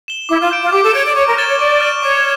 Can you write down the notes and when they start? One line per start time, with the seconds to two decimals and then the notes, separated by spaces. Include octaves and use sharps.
0.08 E7 G7
0.29 E4 D6
0.40 F4
0.51 G6 D7
0.62 F4
0.72 G4 D6
0.84 A4
0.94 C#5 G6 D7
1.05 D5
1.15 C#5 C#6
1.27 A#4
1.37 C#5 F6 A6 E7 G7
1.48 C#5
1.59 D5 C#6
1.81 F6 A6 E7 G7
2.02 C#5 D6